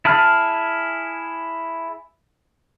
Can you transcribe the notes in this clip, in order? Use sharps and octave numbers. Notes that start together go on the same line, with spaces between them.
E4 G#4 A5 F6